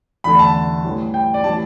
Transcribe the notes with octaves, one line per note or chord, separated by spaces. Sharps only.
E2 D3 A3 B5
A5
A2 E3 G3
G5
D5
A2 E3 G3 A5